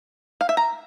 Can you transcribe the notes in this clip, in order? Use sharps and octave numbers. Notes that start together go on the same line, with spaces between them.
F5
E5
A#5